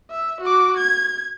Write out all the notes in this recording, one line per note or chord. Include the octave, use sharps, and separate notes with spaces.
E5
F#4 D6
G#6